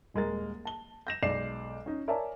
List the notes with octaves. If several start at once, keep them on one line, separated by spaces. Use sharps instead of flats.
D#1 G#3 A#4 A6
A5 G7
G6 A#6 E7
B1 G#3 D5 C7 E7
C#4 D#4
A#4 C#5 D5 E5 G#5 A5